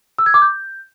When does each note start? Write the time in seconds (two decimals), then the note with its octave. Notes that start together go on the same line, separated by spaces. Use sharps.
0.18 E6
0.26 G#6
0.34 D6
0.42 G6